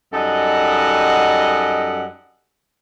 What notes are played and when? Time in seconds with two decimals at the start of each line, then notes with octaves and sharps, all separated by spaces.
0.13 F#2 G3 D#4 A4 D#5 F#5